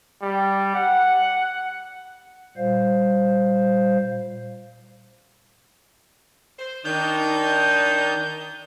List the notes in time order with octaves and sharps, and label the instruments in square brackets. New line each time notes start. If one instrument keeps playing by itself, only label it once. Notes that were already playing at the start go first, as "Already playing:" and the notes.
[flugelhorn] G3
F#5
[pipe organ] A#2 G3 C5 F5
[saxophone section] C5
[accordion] D#3 G6 [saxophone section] D4 D#4